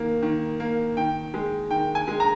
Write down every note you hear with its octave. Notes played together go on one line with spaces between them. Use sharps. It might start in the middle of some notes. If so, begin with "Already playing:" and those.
Already playing: D#3 A#3
D#3
A#3
D#3 G5
G#3
D#3 G5
G#5
G#3
A#5